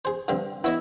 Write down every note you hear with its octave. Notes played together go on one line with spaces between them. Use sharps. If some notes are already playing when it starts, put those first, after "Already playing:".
G#4 C5
G2 D3 C4
B3 E4 C#5 D#5